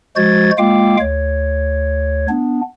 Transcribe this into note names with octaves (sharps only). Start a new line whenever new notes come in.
F3 G#3 F#4 C5 G#6 A6
G#3 A#3 F4 F5 G5 D6
D2 C#5
B3 D4